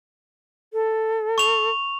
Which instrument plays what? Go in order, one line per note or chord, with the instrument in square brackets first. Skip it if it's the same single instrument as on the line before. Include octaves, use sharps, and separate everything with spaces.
[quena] A4
[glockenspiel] C#6 F7